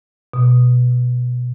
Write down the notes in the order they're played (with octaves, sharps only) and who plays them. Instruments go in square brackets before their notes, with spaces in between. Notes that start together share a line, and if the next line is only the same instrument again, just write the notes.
[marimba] B2